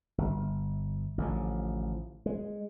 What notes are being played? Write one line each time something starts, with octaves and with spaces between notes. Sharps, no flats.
G1
A1 D3 F3
G#3